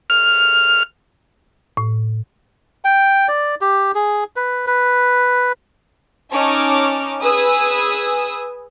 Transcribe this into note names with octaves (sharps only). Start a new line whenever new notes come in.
F6
A2
G5
D5
G4
G#4
B4
B4
C#4 D#4 A5 C#6 D6 F6
G#4 B4 G#5 D#6 E6